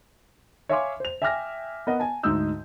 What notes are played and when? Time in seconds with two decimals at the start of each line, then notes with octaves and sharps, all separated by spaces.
0.69 C#5 E5 F5 G#5 C6 D6
1.00 C5 F7
1.22 E5 G5 G#5 D6 F6 A#6
1.87 B3 A#4 D#5 F#5
1.99 G#5 A5
2.23 D2 G#2 D#4 D#6 E6 G6